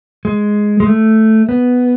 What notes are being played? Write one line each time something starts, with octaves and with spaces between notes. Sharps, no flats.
G#3
G#3
A3
B3